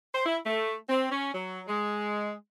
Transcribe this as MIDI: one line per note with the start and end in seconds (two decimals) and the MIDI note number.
0.15 0.22 72
0.26 0.38 64
0.46 0.74 57
0.89 1.08 60
1.12 1.32 61
1.34 1.62 54
1.68 2.33 56